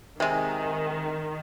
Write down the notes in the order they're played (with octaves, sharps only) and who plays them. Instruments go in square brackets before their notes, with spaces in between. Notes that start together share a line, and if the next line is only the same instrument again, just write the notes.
[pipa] C3 G#3 [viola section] D#3